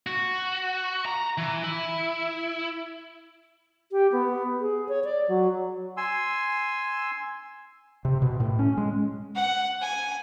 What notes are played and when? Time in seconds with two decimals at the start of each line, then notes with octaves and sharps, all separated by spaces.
0.07 F#4
1.06 A#5
1.38 E3
1.63 E4
3.92 G4
4.12 B3
4.60 G#4
4.89 C#5
5.05 D5
5.29 F#3
5.97 G#5 C6 E6
8.05 C3
8.22 B2
8.40 A2
8.59 C#4
8.77 G#3
9.36 F#5
9.82 G#5